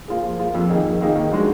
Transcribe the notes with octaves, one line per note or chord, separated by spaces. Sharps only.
A#3 F4 G#4
F3
A#3 F4 G#4
F2
D#3 A#3 D#4 G#4
F2
D#3 A#3 D#4 G#4
D#3
G#3 D4 F#4